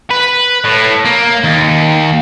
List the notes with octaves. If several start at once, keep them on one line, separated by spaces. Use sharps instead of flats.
B4
A2
A#3
D#2